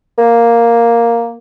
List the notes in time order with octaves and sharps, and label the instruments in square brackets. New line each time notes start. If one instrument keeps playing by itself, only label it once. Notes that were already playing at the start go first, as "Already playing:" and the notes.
[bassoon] A#3